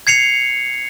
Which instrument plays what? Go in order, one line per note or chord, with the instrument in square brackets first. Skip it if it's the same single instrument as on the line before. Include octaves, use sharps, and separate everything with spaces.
[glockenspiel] G#6 C7 C#7 F7